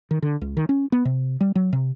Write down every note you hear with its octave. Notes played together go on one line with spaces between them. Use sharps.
D#3
D3
C#2
D#3
C#4
B3
C3
G3
F#3
C3